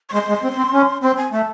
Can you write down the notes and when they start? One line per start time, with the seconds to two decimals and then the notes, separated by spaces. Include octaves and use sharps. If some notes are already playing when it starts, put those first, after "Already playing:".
0.10 C#6
0.14 G#3 C6
0.29 G#3
0.44 C4
0.58 C4
0.73 C#4
1.02 C4 C6
1.17 G#5
1.32 A3 A5